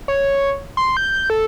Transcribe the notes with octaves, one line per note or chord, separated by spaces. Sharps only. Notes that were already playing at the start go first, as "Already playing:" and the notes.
C#5
C6
G6
A4